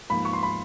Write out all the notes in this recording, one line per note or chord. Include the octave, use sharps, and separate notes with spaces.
G#2 F3 A#3 B5
C#6
C6
B5